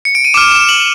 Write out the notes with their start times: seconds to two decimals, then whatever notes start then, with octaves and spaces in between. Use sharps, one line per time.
0.05 C#7
0.15 D7
0.25 D#7
0.34 D6 F6 E7
0.51 E7
0.69 F#7